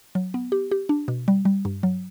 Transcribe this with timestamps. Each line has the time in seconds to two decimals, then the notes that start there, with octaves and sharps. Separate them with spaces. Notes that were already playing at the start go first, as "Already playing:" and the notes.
0.15 F#3
0.34 B3
0.52 G4
0.71 G4
0.89 D4
1.08 B2
1.28 G3
1.45 G3
1.65 G2
1.83 F#3